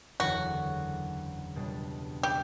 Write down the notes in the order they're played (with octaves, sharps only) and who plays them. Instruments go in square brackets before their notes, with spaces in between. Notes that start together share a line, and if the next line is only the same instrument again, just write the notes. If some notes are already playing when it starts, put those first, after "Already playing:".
[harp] F#1 E2 D3 [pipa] F#4
[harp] C#2 B2 G3 D4
[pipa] G4